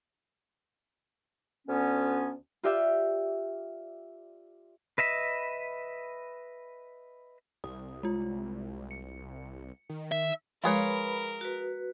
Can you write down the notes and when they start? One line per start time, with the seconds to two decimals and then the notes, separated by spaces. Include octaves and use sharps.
1.67 D2 B3 C#4
2.63 F4 G4 D5 E5 G5
4.98 B4 D#5 E5 B5
7.64 C2 D#6
8.03 G#3 F4
8.91 C#7
9.89 D#3
10.12 E5
10.64 F3 G#3 F4 G#4 A#4 B4 C#5 B5
11.41 F#4 B4